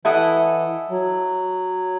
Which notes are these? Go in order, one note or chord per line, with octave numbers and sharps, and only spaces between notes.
E3 E4 A4 D#5 F#5
F#3